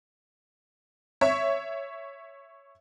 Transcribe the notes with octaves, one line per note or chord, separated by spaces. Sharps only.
C#5 E5 C#6